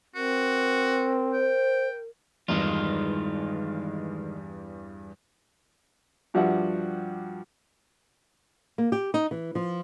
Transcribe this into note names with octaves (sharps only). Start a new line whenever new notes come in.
C4 F#4 A#4
C5 G5
E2 G2 D#3 G#3 F4
G2 F3 F#4 G4 E5 F#5
A#3
G4
D#4
E3
F3